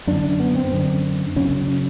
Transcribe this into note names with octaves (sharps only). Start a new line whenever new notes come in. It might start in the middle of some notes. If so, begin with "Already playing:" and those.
F#2 D3 D4
B3
C4
F#2 D3
F#2 C#3 C#4
C#4